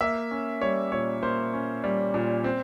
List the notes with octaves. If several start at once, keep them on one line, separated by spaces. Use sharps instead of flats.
A#3 E5
C#4
G3 C#5
A#2 C#5
A#3 C5
C#4
G3
A#2
C4